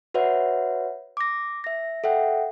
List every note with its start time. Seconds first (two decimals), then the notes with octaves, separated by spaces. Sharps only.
0.14 F#4 B4 C#5 E5 F#5
1.17 D6 A#6
1.64 E5 A#6
2.04 A4 E5 F#5 G5